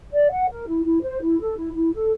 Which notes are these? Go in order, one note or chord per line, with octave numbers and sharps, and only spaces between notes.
D5
F#5
A#4
E4
E4
C5
E4
A4
E4
E4
A4